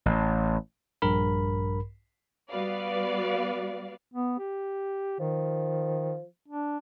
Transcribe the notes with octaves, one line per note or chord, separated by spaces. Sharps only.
A1
A#1 G2 A#4 B5
G3 B3 F#4 B4 D5 F5
B3
G4
D#3 F3
D4